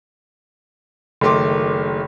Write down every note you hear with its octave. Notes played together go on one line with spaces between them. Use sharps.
F#1 D#3 A3 C6 D6